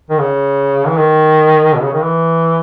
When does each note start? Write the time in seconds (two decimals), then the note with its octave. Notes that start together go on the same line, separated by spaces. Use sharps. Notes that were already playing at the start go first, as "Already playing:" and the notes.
0.09 D#3
0.19 C#3
0.87 E3
0.97 D#3
1.75 B2
1.83 C#3
1.93 D#3
2.02 E3